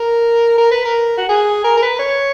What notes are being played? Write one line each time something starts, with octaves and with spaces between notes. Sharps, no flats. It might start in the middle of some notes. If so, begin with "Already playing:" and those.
Already playing: A#4
A#4
B4
A#4
F#4
G#4
A#4
A#4
B4
C#5